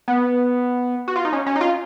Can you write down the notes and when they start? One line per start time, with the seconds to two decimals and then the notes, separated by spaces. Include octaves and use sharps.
0.08 B3
1.08 F#4
1.16 F4
1.25 D#4
1.33 C#4
1.46 C#4
1.56 D#4
1.61 F4